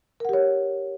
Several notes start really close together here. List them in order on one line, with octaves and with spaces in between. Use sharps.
A#4 F#5 G4 C#5